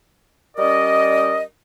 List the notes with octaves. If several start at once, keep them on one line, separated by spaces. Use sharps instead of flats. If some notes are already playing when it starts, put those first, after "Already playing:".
G3 C#4 A#4 D5 D#5